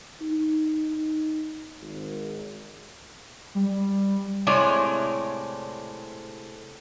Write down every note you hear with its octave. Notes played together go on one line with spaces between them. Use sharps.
D#4
G#1
G3
A2 C3 G#3 C#5 D5